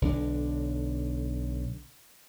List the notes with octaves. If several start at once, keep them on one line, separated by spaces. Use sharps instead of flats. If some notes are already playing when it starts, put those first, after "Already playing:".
B1 D3 D4